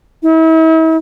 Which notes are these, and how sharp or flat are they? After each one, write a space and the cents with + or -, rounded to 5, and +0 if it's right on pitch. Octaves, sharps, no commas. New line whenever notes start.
E4 -40